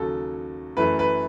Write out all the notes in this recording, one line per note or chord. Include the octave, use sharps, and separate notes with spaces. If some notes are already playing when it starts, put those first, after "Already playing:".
Already playing: D#2 C#3 F#3 A4
F#2 E3 A3 B4
B4